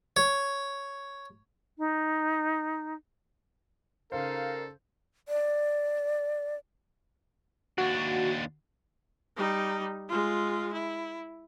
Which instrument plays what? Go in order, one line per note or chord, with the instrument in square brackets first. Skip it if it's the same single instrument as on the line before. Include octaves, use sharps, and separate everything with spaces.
[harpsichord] C#5
[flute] D#4
[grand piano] C#3 C5 [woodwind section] G3 D#4 F5 [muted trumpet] A4 [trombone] A#4
[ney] D5
[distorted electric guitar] D#2 D4 [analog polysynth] F#4
[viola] G3 D#4
G#3 F4
E4